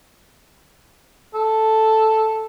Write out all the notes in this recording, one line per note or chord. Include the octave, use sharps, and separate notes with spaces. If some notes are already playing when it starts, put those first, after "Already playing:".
A4